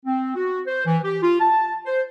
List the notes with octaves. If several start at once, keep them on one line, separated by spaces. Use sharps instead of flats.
C4
F#4
C5
E3
G4
F4
A5
C5